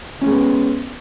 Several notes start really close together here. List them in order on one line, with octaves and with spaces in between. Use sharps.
C#4 G#3 B3